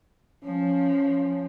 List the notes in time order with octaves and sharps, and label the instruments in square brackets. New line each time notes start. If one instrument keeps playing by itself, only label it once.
[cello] F3 [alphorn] C#4